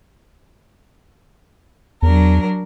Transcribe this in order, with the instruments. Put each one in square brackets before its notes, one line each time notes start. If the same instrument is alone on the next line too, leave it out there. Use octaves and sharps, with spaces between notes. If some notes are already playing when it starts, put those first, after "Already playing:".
[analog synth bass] E2 [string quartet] F#3 D4 A#4